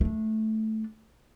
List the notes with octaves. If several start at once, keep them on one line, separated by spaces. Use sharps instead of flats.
A3 D4